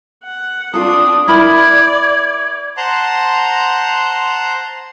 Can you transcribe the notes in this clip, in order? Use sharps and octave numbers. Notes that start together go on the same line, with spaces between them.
F#5
C4 D4 F4 A4 D#6
E4 A#4 D5 B5 G#6
C5 F#5 A5 A#5 C6